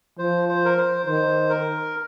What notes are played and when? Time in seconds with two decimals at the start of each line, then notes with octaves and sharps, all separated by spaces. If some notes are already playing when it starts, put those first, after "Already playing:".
0.19 F3 C5
0.49 C5
0.65 A#4
0.78 C5
1.06 D#3 C5
1.49 A#4